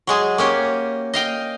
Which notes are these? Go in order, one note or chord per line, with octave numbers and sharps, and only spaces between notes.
F#3 G#3 G#4
A#3 C#4 G4
D#5 F5 G5